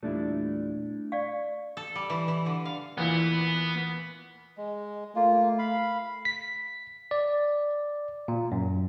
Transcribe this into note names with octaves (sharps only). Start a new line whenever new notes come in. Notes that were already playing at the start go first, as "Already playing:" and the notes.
E2 A#2 G3 A3 D4 E4
D5 F5 C#6
A4
G3
E3
E3
D3
F5
E2 A#2 E3 B3
G#3
A3 A#3 F4
F5 B5
B6
D5
A#2
F#2